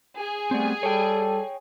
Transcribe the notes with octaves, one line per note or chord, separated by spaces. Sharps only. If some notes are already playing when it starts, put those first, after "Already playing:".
G#4
G3 A3 B3 C4
G3 A4 C#5 G5